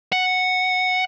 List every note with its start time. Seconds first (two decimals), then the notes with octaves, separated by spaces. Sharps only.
0.12 F#5